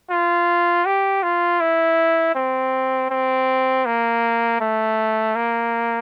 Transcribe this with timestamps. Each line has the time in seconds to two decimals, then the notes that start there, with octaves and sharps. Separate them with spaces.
0.10 F4
0.85 G4
1.23 F4
1.60 E4
2.35 C4
3.10 C4
3.86 A#3
4.60 A3
5.35 A#3